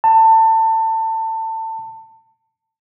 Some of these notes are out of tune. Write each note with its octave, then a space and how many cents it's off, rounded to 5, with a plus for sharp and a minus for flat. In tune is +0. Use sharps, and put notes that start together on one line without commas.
A5 +25